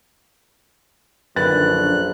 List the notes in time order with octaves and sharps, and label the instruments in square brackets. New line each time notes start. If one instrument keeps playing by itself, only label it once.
[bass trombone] A#1 [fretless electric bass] F#2 D3 D#3 [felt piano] B4 A6 [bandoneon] F#6